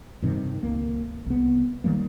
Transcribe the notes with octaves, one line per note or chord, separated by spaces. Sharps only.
G2 C3 D#3
C#2 A#3
C2 B3
D#3 E3 G3 A#3